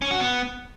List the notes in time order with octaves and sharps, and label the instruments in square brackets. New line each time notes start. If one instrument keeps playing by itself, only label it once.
[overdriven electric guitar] C#4
F#4
B3